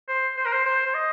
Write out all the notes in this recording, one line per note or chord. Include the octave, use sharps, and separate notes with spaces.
C5
C5
A#4
C5
C5
C5
D#5